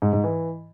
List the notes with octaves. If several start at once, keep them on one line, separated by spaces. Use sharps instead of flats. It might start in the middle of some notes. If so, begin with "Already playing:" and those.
G#2
G#2
E3